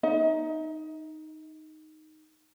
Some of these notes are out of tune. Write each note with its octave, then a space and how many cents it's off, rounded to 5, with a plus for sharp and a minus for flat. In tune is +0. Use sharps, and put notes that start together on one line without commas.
D#4 +0 D#5 +40